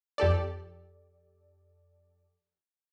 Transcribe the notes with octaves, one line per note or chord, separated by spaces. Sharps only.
F2 G4 A4 D5